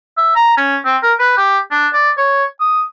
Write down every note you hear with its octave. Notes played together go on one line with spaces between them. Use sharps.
E5
A#5
C#4
C4
A#4
B4
G4
D4
D5
C#5
D#6